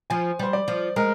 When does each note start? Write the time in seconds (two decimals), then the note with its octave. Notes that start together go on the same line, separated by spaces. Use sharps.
0.10 F3 G#5
0.39 G3 C5
0.53 D5
0.68 F3
0.96 G#3 A#4